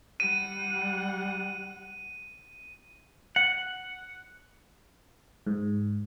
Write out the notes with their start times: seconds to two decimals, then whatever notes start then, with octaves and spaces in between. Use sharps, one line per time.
0.20 G3 F#5 D#7
3.36 F#5
5.47 G#2